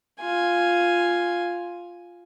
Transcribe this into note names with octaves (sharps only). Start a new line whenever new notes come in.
F4 G#5